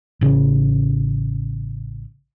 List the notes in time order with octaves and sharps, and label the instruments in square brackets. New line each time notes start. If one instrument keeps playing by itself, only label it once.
[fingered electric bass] A1 C#3